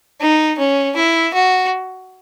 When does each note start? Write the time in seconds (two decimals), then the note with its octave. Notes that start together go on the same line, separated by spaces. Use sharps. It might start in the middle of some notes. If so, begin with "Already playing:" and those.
0.21 D#4
0.58 C#4
0.96 E4
1.34 F#4